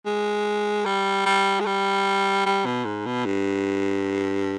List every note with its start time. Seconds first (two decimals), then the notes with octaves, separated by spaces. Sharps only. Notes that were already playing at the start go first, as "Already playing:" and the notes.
0.06 G#3
0.86 G3
1.26 G3
1.60 G#3
1.66 G3
2.46 G3
2.65 B2
2.85 G#2
3.06 B2
3.25 G2